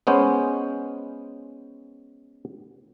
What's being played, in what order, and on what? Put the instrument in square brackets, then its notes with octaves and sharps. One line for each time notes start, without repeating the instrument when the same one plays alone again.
[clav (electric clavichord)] G#3 B3 C#4 C5